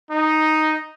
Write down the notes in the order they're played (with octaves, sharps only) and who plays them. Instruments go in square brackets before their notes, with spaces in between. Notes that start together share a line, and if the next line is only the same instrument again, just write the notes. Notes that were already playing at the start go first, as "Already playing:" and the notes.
[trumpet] D#4